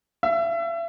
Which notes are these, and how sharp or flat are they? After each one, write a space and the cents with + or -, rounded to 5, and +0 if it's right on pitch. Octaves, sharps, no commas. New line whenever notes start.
E5 +35